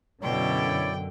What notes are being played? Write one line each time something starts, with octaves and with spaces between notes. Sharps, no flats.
F#2 B2 D3 E4 C#5 D5 G5